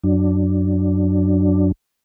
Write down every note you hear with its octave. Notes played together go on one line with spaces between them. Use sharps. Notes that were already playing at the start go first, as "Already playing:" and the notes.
F#2 F#3 D4